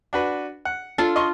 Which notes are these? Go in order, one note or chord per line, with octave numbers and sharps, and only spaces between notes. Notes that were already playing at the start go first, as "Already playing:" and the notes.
D4 F#4 B4
F#5
D4 F4 A4
D#5 C6 C#6